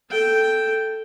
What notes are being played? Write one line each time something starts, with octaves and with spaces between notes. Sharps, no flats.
A4 G5